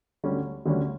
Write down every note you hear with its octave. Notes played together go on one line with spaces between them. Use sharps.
D2 D3 G3 C#4
D2 D3 G3 C#4